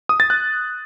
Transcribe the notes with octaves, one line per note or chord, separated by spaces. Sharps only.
D#6
A6
F#6